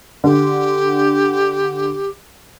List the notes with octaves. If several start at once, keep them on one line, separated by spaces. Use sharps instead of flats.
D3 G4